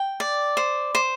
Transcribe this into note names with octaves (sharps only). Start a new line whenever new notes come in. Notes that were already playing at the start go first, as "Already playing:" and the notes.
Already playing: G5
D5
C5
C5